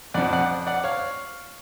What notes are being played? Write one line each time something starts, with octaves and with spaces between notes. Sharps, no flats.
F2 F3 D5 F#5
D5 F#5
D5 F#5
C#5 F5